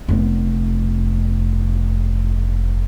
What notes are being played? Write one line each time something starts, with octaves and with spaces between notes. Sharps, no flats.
F1 B3